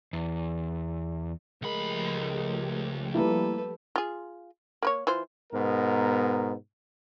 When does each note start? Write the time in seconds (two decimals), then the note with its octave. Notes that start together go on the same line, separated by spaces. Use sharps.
0.13 E2
1.62 C#2 F3 G#3 A3 G4 A#4 B5
3.14 G3 A#3 E4 A4 B4
3.96 F4 G#4
4.82 A#3 B4 C#5
5.07 E3 F4 C5
5.53 G#2 B2 B3 A#4